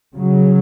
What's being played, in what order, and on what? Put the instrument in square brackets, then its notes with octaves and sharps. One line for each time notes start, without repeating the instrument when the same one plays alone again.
[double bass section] C#3 F#3